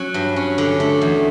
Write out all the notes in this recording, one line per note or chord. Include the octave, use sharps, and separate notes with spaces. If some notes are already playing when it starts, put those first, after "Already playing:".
Already playing: F#3 C#4
G2
C#4
D3
A3
E2